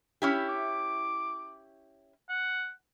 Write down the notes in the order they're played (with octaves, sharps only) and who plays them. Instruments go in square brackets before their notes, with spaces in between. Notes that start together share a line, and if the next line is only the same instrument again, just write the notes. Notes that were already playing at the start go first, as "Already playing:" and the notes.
[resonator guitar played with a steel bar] C#4 E4 G4
[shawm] D6
F#5